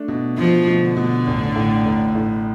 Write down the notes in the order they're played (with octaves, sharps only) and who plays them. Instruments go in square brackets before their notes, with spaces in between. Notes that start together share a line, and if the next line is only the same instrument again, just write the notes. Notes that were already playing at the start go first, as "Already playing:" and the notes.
Already playing: [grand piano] A3 D4
B2
[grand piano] B2 [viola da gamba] F3
[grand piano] B2
[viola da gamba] D3
[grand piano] B2
A1
A2
A1
A2